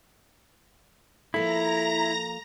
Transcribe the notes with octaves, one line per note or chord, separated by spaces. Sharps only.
F3 A#3 E4 A4 A#5 A#6